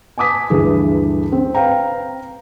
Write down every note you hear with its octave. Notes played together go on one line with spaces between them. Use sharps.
G#5 A5 D6 D#6 B6
D2 G2 E3 G#4
C4
B4 C5 F5 G5 A#5